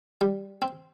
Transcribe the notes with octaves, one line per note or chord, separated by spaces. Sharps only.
G3
C4